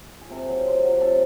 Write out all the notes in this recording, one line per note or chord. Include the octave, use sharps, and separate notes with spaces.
G#4
C3 A4
F#3
C3 C5
F#3
C3 A4